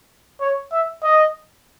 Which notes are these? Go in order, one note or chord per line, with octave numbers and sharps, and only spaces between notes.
C#5
E5
D#5